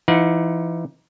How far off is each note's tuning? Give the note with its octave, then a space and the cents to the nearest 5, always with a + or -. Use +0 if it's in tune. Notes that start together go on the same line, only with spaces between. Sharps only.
E3 +35 D#4 +25 F#5 -35